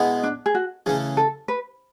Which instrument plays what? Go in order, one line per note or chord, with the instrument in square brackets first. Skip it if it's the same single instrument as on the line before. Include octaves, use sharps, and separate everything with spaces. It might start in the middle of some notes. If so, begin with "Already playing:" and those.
Already playing: [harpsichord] B2 G#3 B3 E4 G#4
[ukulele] D4
G#4
F#4
[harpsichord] C#3 E3 A3 C#4 [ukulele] G#4
[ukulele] A4
B4